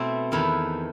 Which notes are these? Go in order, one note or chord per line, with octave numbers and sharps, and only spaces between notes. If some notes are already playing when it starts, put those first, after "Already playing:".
Already playing: B2 A3 C4 E4
E2 D#3 A3 E4 B4